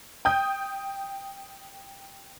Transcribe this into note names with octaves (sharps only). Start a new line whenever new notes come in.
G5 D#6 G6